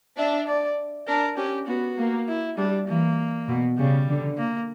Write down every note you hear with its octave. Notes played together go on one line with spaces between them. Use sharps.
D4 E5
D5
D4 A#4
C#4 G4
B3 F#4
A#3
E4
G3 D4
E3 A#3
B2
C#3 G3
D3
A#3